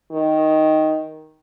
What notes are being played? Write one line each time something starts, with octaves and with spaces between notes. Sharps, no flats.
D#3